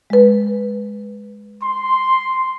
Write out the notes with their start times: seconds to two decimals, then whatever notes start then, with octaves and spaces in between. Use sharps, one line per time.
0.10 G#3 B4
1.62 C6